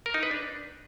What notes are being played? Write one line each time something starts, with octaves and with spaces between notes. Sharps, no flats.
A#4
D#4
B4
D4